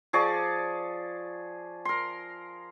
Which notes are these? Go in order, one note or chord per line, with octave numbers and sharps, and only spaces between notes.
F3 G#4 D5 C#6
A#4 C6